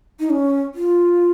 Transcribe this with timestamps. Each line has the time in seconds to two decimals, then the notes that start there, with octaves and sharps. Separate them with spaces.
0.20 D#4
0.30 C#4
0.75 F4